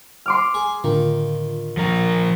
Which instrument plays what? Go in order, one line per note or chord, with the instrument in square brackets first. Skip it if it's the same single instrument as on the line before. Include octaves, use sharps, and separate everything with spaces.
[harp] C6 D6 F6
[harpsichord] G#4
[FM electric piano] A2 D3 F4 [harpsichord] D#3
[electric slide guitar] F3 A#4